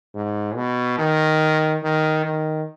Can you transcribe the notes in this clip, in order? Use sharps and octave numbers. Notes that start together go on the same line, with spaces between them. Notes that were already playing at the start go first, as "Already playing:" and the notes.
G#2
B2
D#3
D#3
D#3